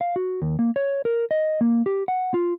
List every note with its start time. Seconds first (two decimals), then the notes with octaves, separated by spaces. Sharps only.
0.01 F5
0.16 F#4
0.42 D#2
0.59 A#3
0.76 C#5
1.05 A#4
1.31 D#5
1.61 A#3
1.86 G4
2.08 F#5
2.34 F4